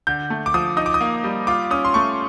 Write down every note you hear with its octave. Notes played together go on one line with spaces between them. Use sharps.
D3 G6
A3
D6
F3 D#6
D#4 D#6
D6
D#6
A#3
G3
F4 D6
C#4 D#6
C6
A3 C#6